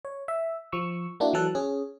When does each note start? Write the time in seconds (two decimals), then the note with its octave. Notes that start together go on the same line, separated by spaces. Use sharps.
0.05 C#5
0.28 E5
0.72 F3 C#6 E6
1.20 A#3 D4 E4 F#4
1.33 E3 F#3 A4 F#6
1.55 C#4 G#4